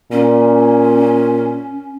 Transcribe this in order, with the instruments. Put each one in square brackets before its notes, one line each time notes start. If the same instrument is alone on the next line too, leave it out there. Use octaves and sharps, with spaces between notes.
[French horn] A#2 [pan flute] C#4